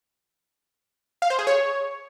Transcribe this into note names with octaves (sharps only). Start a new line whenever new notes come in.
F5
C5
G#4
C#5